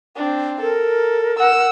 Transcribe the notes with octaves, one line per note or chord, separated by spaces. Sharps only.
C4 D4
A4 A#4
F#5 E6